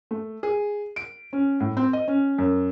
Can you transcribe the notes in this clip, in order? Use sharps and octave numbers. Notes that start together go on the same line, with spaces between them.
A3
G#4
D7
C#4
A2
C4
D#5
C#4
F#2